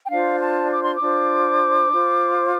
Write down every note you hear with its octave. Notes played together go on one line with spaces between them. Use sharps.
G5
D4 F4 C5 F5
A5
D6
C6
D6
D4 F4 C5
F4 C5